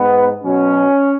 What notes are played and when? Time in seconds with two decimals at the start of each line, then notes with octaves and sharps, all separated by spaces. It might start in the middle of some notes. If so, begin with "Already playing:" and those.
Already playing: G#2 G#3 B3
0.43 B2 F#3 C#4